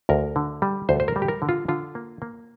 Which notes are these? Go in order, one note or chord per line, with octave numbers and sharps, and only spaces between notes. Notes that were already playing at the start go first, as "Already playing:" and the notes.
D2 A#4
D3
G3
D2 C5
C5
A#4
G3
G4
A#4
D3
F4
D3 F4
A#3
A#3